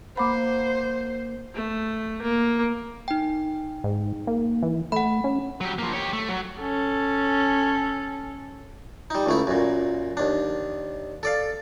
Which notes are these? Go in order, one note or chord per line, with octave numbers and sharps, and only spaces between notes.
A#3 C5 F#5 B5 D6
A3
A#3
D#4 G5
G#2
A#3
E3
A3 F#5 B5
C#4
F#3 G4
F3 A#3
G4 C#5
A3
F#3
C#4 A4
G3 D#4
C#2 A3 E4
F#2 A#2
D#2 D4
A4 D5 F5